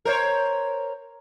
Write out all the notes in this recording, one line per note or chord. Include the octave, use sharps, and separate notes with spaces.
A#4 C5 C#5